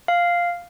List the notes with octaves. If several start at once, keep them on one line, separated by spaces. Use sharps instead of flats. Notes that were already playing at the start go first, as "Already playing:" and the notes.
F5